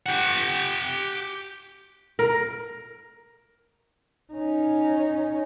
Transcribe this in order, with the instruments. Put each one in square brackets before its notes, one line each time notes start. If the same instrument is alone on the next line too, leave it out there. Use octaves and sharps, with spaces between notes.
[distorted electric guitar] G4 F#5
[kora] A#4
[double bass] C#4 D#4